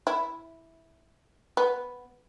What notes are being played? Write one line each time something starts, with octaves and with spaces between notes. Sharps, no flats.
E4
B3